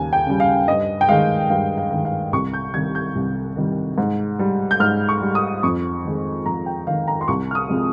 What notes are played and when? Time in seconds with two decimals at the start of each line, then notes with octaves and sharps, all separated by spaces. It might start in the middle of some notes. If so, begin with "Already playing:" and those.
Already playing: D#2 C#3 G3 G#5
0.13 G5
0.27 C#3 G3
0.40 F5
0.68 G2 D#5
1.01 G5
1.08 D#3 G#3 F5
1.50 G2 F5
1.78 F5
1.91 D#3 G#3
2.05 F5
2.33 C2 C#6
2.54 G6
2.74 C3 D#3 G3 G#6
2.95 G6
3.15 C2
3.57 C3 D#3 G3
3.98 G#2
4.39 G3
4.71 G6
4.80 G#2 F6
5.09 C#6
5.22 G3
5.35 D#6
5.63 F2 C#6
6.05 D#3 G#3
6.46 F2 A#5
6.66 G5
6.87 D#3 G#3 F5
7.08 A#5
7.21 C6
7.28 C2 C#6
7.51 F6
7.55 D#6
7.69 C3 F3 G#3